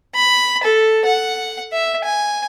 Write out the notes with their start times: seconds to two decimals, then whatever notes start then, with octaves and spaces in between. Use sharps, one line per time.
0.15 B5
0.64 A4
1.05 F#5
1.72 E5
2.05 G#5